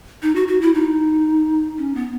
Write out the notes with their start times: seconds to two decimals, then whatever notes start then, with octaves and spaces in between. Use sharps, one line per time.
0.22 D#4
0.36 F#4
0.48 F#4
0.61 E4
0.74 D#4
1.78 C#4
1.95 B3